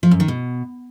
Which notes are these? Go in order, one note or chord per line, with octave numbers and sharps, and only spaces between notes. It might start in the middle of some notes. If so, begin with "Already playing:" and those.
F3
F#2
D#3
B2